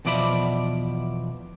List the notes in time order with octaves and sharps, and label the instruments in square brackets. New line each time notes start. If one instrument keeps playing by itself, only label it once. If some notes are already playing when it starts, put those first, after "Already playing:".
[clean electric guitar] E2 B2 F3 D5 E5 B5